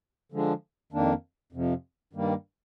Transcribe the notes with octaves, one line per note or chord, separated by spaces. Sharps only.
D3 F3 G#3 D4
F2 D#3 A#3 D4
F2 C3 F3
G2 D#3 G3 A#3